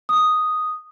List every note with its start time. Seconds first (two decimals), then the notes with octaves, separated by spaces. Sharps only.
0.09 D#6